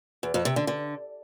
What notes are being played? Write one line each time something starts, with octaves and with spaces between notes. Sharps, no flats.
E2
F2
C3
D3
D3